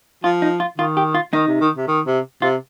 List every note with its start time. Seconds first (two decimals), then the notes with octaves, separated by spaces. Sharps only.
0.24 F3 F4
0.42 D#4
0.60 F4
0.78 D#3 F4
0.97 G4
1.15 F4
1.33 D#3 D#4
1.47 C3
1.61 D#3
1.77 C3
1.88 D#3
2.06 C3
2.42 C3 F4